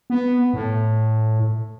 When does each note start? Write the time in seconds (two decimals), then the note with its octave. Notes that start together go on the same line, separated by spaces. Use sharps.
0.10 B3
0.54 A2